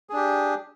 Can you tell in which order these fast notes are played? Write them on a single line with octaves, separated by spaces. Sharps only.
G#4 D4 G4